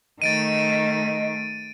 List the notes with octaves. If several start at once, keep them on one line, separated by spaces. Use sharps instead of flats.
D#3 A3 D#5 A6 D7 D#7